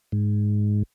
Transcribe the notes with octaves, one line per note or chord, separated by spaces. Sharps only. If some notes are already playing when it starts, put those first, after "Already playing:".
G#2